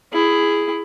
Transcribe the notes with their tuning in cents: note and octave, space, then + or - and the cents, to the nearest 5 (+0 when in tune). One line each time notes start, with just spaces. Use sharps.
E4 +15 G#4 +0